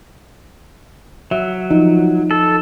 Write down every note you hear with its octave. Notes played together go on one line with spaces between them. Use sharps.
F#3 E5
F3 D#4
A4